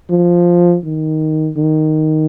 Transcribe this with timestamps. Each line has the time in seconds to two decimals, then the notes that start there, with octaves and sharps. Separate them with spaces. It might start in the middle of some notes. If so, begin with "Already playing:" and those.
0.10 F3
0.84 D#3
1.57 D#3